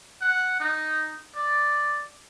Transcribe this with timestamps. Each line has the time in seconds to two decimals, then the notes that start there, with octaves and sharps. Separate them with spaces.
0.21 F#5
0.60 D#4
1.36 D5